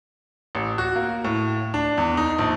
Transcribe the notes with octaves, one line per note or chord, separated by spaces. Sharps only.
A1
F#4
A#3
A2
D4
E2
D#4
A#1